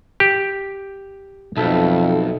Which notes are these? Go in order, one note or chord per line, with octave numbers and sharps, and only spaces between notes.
G4
B1 F2 D#4 A4 E5